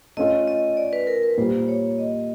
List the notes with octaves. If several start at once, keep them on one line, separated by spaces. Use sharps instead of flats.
A3 C#4 F4 A4 D#5
D#5
D5
B4
A#4
B4
A#2 G3 A#3 C5
C#5
D#5